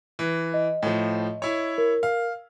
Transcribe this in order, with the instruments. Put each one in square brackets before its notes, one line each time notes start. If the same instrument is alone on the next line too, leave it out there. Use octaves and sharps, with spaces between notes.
[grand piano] E3
[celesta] D#5
[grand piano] A2 F3
E4 C#5
[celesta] A#4
[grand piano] F5